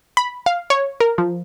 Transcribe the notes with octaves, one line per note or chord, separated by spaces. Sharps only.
B5
F5
C#5
A#4
F3